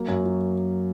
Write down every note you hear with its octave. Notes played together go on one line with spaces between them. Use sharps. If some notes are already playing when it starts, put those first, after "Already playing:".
Already playing: F#3 A#3
F#2
F#3